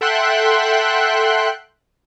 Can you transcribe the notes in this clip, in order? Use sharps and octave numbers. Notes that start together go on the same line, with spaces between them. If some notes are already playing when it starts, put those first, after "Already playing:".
A4 E5 F#5 G5 C6 F#6